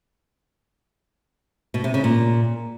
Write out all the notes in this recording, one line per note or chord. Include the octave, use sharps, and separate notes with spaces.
B2
C3
C#3
A#2